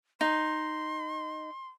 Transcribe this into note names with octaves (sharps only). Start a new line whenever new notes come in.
D#4 C6